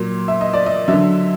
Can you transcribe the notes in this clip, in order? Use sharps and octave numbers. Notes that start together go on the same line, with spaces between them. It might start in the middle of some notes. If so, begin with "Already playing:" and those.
Already playing: A#2 F#3
E5
D#5
D5
D#5
D3 F#3 E5